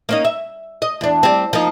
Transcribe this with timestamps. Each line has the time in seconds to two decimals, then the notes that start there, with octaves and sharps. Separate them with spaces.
0.09 A#3 C#4 D#4
0.25 E5
0.82 D#5
1.01 E2 D4
1.23 G3 C4
1.53 F3 A#3 D#4